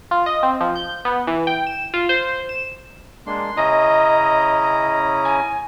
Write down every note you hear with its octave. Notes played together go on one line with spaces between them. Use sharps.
F4
D#5
C4
F3
G6
B3
E3
G5
E7
F4
C5
E7
G#3 A#3 D4 C6
C#3 C#4 E4 D#5 A#5 D#6
G#5